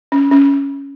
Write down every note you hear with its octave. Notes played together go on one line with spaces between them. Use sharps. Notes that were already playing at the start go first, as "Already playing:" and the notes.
C#4
C#4